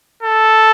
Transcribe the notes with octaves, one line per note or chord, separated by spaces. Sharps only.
A4